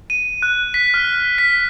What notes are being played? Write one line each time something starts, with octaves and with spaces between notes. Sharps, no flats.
D#7
F#6
B6
F6
B6